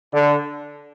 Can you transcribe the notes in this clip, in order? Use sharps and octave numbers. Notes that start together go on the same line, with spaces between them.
D3